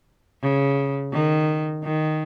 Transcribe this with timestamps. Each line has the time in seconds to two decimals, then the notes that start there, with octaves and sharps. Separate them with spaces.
0.42 C#3
1.12 D#3
1.83 D#3